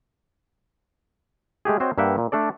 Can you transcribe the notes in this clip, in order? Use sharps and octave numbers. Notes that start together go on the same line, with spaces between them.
G#3 A3 G4 G#4
C4 F#4 C5 C#5 D#5
G2 A#3 B4 E5 F#5 G5
A#2
A3 D4 A4 D5